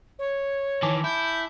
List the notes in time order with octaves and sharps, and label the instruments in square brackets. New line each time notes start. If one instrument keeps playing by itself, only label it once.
[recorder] C#5
[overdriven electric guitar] D#3 E3 [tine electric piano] G#5 A5 D6
[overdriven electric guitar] E4 [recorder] G6